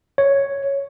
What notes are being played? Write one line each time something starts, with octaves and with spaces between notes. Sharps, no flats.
C#5